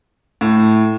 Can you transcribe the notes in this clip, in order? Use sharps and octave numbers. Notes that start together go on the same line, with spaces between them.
A2